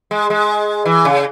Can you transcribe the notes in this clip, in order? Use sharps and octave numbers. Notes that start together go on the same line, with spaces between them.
G#3
G#3
E3
C#3